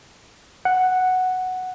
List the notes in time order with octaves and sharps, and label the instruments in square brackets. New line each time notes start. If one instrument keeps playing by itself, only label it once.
[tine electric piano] F#5